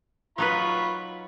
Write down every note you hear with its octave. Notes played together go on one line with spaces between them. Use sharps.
F#3 D#4 F4 B4 B5 C#6